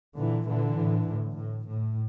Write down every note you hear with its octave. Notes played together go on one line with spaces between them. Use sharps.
A#2 D3 E3
A#2 D3 E3
A2
A2
A2
A2